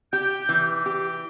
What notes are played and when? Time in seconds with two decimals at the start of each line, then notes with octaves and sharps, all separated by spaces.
0.12 G4 G6
0.49 E3
0.86 G4